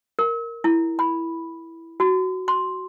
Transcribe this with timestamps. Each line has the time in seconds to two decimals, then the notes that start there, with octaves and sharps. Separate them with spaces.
0.19 A#4
0.64 E4
0.99 B5
2.00 F#4
2.48 C6